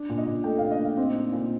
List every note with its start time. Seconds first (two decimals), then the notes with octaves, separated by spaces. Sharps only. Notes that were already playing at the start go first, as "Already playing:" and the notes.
Already playing: D4
0.10 A#2
0.18 D#5
0.27 A#2
0.44 A3 G5
0.58 D4 F5
0.71 D#5
0.79 A#2 F5
0.97 C4
1.16 D#4
1.33 A#2